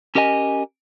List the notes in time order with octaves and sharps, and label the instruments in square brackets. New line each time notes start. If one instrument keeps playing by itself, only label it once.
[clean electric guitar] C#4 G4 A#4 D#5 G#5